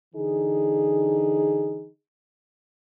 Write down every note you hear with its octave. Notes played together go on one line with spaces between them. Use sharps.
D3 E3 D#4 G#4